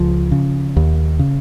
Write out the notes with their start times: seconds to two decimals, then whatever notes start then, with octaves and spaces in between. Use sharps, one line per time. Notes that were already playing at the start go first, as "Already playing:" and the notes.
Already playing: C#2 F3
0.31 C#3
0.77 D#2
1.19 C#3